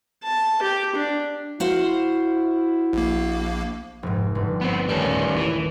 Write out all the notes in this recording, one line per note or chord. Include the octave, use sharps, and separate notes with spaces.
A5
G4
D4
E4 F#4 C5 F5
A#1 A#3
F1 G#2
G1
B3 C4
D#1 G3 A3 C#4 E7
E3